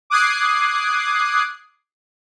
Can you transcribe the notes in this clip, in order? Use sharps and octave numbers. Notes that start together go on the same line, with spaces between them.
D6 D#6 F#6 G#6 C7